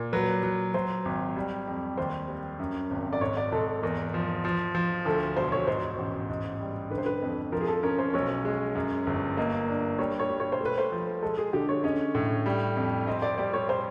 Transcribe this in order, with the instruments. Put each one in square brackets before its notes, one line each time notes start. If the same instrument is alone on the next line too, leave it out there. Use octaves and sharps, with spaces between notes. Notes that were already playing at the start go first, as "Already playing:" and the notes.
Already playing: [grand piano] A#2
[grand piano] F#3 [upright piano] B4
[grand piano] F#3
[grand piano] F#3 [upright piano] C5
[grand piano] G#1
G3
F2
[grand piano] D#2 [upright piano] C5
[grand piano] G3
F#2
G#1
[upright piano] D5
[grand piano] G#2 [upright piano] C#5
[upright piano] D5
[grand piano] G#2 [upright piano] A4
[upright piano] A4
[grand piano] E2 [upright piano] A#4
[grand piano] F3
F3
F3
[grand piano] D2 [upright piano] A4
[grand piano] E1 [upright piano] C5
[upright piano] C#5
[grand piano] G#2 [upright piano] C5
[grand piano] A1
G#2
G3
[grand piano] D3 [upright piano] B4
[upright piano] C5
B4
[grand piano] F2
[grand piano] F3 [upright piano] A#4
[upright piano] G#4
A4
[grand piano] C#4 [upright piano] A#4
[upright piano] C5
[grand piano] B1 [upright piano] C#5
[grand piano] G#3
F#2
G1
[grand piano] A#3 [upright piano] D#5
[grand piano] D4
[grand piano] G3 [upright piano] C#5
[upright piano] C#5
[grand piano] G3
[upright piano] C#5
C5
[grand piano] A3 [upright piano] B4
[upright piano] C5
[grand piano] F3
[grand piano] G#3 [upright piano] A4
[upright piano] G#4
[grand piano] D3 [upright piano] G4
[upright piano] C#5
[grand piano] C#4 [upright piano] D#5
[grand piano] A2
G3
F2
[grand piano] C4 [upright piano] D#5
[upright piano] D5
[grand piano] G3 [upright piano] D5
[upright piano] C#5
C5